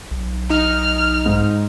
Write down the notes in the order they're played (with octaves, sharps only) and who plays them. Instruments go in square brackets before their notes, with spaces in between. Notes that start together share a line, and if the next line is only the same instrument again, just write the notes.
[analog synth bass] B1
[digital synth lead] D#4 [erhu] F6
[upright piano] G#2